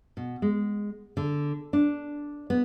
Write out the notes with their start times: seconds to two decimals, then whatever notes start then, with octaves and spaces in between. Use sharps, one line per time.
0.17 B2
0.42 G#3
1.17 D3
1.73 D4
2.50 B3